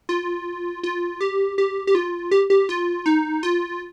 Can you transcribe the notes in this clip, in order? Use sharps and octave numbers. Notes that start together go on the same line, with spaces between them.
F4
F4
G4
G4
G4
F4
G4
G4
F4
D#4
F4